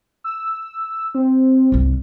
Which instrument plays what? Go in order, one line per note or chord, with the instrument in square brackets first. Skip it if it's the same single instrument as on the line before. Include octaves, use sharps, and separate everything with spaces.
[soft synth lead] E6
C4
[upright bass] G1 C2